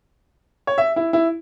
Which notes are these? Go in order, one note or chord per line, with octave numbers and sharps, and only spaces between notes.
C#5
E5
E4
E4